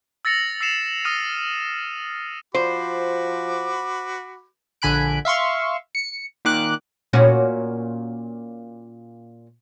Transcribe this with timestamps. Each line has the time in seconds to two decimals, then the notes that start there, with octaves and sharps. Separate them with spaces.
0.25 E6 A6 A#6 C#7 F7 F#7
0.61 E6 A#6 C7 C#7 E7 F7
1.05 D#6 F6 A#6 D#7
2.55 F3 F#4 C5 B5 D6
4.82 A#1 D3 G#5 B5 F#6 D7
5.25 E5 F5 C6 C#6
5.95 C#7
6.45 A#2 D#3 D6 F#6
7.13 A#2 C#4 F#4